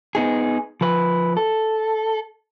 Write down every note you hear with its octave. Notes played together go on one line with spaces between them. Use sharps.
B3 D#4 G#4
F3 B4
A4